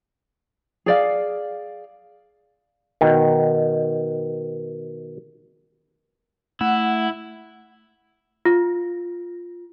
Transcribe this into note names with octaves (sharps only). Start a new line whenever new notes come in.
G#4 D5 F5
B2 D#3
A3 E4 F#5
F4